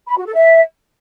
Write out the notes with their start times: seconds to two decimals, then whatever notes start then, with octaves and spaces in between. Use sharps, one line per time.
0.07 B5
0.16 F#4
0.26 A4
0.35 E5